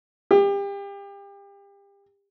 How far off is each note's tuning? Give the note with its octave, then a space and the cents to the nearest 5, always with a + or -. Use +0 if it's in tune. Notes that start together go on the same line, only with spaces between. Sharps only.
G4 +30